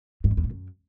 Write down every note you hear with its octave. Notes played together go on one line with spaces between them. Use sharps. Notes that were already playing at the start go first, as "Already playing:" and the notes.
G#2
F#2
E2
A2
F#2